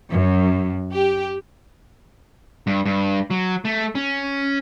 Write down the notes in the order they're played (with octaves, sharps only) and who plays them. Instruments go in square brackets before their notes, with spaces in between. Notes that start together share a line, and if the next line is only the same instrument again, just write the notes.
[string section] F#2
G4
[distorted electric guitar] G2
G2
F#3
A3
C#4